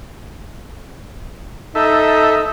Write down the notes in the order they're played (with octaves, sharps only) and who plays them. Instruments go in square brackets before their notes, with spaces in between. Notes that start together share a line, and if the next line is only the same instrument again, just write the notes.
[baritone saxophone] D#4 [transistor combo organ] A4 E5